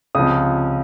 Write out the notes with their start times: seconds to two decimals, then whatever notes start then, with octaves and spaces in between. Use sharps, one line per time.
0.15 C#2 C3 F3 D#6